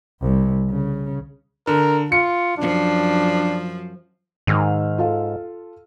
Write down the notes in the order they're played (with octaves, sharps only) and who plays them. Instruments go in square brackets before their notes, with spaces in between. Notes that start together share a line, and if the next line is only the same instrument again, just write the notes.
[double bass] C2
C#3
[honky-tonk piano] D3 [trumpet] A#4
[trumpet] F4 [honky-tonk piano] C#7
[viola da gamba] F#2 F3 [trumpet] D4
[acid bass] G#2 [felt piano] D#3 E6 F6
[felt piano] F4 A4 F5